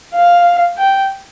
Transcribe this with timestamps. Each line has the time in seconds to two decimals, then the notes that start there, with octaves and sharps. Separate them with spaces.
0.14 F5
0.78 G5